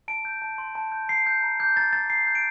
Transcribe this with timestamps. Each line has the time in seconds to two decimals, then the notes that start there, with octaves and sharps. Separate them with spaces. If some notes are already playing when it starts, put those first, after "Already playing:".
0.08 A5 D7
0.25 G6
0.42 A5
0.58 C6
0.75 A5
0.92 G6
1.09 A#5 C7
1.27 G6
1.43 A#5
1.60 D6 G6
1.77 A#5 A6
1.93 G6 A6
2.09 A#5 C7
2.27 G6
2.35 D7